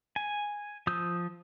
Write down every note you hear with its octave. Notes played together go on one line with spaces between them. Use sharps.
G#5
F3 D#6 E6 G6